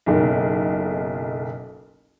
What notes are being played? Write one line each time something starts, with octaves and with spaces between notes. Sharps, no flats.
F#1 B1